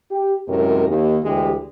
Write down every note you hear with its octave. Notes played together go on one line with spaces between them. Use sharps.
G4
F#2 A2 C3 G#3 A#4
D#2
D2 E3 G#3 G4